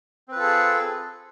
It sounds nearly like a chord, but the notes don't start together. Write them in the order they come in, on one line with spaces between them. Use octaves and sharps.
C4 B4 F4 A4 G#4